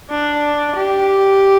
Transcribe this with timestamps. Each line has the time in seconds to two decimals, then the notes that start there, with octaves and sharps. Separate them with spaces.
0.10 D4
0.76 G4